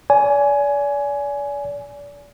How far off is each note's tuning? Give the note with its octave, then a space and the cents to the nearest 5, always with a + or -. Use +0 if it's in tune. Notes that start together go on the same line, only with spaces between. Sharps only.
D5 -35 G#5 +10